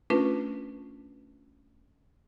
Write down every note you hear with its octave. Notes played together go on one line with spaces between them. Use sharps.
A3 C#4 D4 F4 A#4 B4